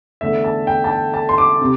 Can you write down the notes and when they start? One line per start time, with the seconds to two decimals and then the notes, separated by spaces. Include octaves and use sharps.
0.21 E2 D3 A3 E5
0.44 A5
0.67 G5
0.84 A5
0.91 G5
1.14 A5
1.29 C6
1.38 D6
1.61 C3